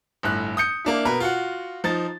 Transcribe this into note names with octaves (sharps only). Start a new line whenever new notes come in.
G1 A2 F#6
D#6 G6 C#7
A#3 D4 E4
B2 A#4 B4
F4 F#4 F#5
F3 D#4 A6